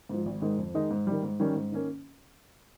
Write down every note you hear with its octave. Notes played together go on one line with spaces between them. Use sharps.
G#2 F3
G#1
G#2 D#3 G#3
F2
D#3 G#3 D#4
G#2
D#3 G3
G#2
D#3 G3 C#4
G#2
D#3 A#3 C#4